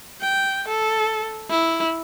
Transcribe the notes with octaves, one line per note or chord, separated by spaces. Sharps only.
G5
A4
E4